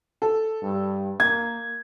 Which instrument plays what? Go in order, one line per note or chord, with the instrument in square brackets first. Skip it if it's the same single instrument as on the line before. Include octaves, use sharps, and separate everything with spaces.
[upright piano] A4
[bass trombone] G2
[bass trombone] A#3 [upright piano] G#6